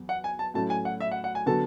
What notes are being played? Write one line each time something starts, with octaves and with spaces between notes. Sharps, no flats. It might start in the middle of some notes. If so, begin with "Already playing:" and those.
Already playing: E2 F#3 B3
F#5
G#5
A5
A2 F#3 A3 C#4 A5
G#5
F#5
E5
F#5
F#5
G#5
D3 F#3 B3 F#4 A4 A5